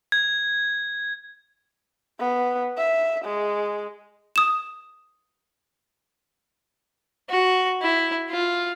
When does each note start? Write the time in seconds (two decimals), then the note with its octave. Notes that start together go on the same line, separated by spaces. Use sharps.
0.12 G#6
2.20 B3
2.78 E5
3.25 G#3
4.36 D#6 E7
7.30 F#4
7.82 E4
8.31 F4